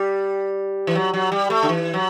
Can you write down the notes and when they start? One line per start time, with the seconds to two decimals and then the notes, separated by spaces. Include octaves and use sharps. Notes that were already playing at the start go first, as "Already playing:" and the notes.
Already playing: G3
0.87 E3
0.95 F#3
1.14 F#3
1.32 G3
1.50 A3
1.63 D3
1.69 E3
1.94 F#3